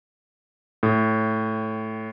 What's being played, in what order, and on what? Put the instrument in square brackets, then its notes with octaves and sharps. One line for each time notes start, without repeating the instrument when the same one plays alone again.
[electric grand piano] A2